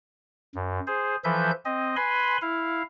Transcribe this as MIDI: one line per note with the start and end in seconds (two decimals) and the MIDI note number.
0.55 0.80 42
0.87 1.16 68
0.87 1.16 72
1.24 1.51 52
1.24 1.51 53
1.24 1.51 69
1.24 1.51 71
1.24 1.51 76
1.24 1.51 91
1.65 1.95 60
1.65 1.95 75
1.96 2.37 71
1.96 2.37 80
1.96 2.37 83
1.96 2.37 84
2.42 2.82 64
2.42 2.82 77